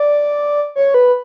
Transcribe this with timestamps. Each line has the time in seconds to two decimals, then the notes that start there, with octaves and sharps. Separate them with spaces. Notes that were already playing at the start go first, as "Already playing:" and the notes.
Already playing: D5
0.76 C#5
0.94 B4